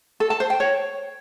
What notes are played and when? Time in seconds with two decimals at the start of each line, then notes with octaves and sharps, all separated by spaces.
0.20 A4
0.30 A5
0.40 C5
0.50 G5
0.60 C#5